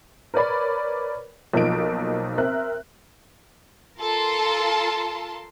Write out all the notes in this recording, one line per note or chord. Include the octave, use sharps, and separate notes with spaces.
A#4 B4 C#5 D5 B5
B1 F3 A#3 D#4 D7
C4 A#4 E5 F#6
F4 A4 A#4 A5 C6